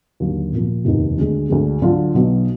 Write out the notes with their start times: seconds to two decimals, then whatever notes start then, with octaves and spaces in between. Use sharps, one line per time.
0.20 D#2 D3 F#3
0.52 A#2 F3 A#3
0.85 F1 D#2 D#3
1.18 D2 D3 G#3
1.49 D2 D3 G#3
1.82 D3 F#3 D4 F4
2.14 B1 B2 F#3